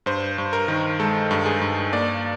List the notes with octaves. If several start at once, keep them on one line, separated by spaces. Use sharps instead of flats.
G2 C5
G2
A#4
D#3
G#3 A4
G2
G#4
G2
A#3 D5